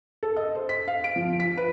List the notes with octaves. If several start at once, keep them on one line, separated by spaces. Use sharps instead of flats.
A4
D#5
C5
B6
F5
D7
F3
B6
B4